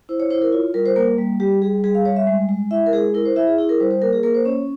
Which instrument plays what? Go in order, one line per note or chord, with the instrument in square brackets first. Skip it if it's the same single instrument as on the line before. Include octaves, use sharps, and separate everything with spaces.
[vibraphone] E4 C5
C#5
E4 C5
A#4
F4 C#5
G3 A#4
C5
A#3 A#4
G3
G3 G4
G3 G#4
G3 G#4
F5
G3 C#5
E5
G#3
G#3
E4 E5
A#4
G#3 G#4
E4 A#4
C5
E4 E5
G#4
E4 G#4
A#4
G3 C5
C5
A#3 A#4
G#4
A#3 A#4
C5
C#4 C#5